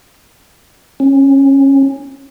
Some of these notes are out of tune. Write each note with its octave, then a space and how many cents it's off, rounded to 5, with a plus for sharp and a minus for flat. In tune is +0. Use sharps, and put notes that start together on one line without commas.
C#4 -20